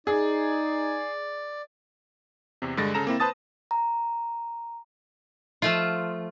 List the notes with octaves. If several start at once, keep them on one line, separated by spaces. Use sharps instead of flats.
D#4 G#4 D5
E2 C3
G2 D3 G#3 A6 A#6
C#3 A4 A#5 A#6 E7
A#3 C4 E4
B4 C5 A5 D#6 A6
A#5
F3 A3 F4